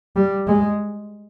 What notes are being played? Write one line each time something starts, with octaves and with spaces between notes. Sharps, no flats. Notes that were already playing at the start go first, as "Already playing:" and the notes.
G3
G#3